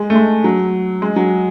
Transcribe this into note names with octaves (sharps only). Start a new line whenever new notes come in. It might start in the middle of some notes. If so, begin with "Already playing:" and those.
Already playing: G#3
A3
G#3
F#3
G#3
F#3